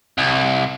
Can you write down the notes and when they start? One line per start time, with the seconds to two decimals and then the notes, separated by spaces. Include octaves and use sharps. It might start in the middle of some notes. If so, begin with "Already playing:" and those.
0.18 C2